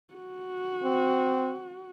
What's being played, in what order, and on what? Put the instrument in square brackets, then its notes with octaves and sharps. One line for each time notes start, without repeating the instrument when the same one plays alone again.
[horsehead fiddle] F#4
[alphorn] C4